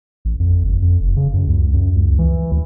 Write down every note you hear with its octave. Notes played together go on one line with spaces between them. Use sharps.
A1
F2
G1
F2
F1
C#3
F#2
C#2
F#2
C#2
E3
D2